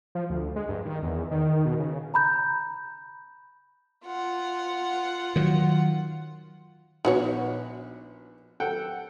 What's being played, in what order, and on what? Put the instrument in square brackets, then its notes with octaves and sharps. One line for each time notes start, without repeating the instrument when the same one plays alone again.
[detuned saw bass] F3
D2
G#3
G2
D#3
E2
D#3
B2
C#3
[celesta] A#5 B5 G6
[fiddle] F4 F#5
[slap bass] D#3 F#3
[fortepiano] A#1 B3 [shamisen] D#4 F#4 C#5
[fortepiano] A4 F#5 G5